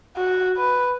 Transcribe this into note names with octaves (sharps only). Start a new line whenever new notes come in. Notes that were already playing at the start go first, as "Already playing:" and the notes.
F#4
B4